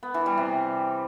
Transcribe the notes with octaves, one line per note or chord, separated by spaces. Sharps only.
B3
E3
G3
C3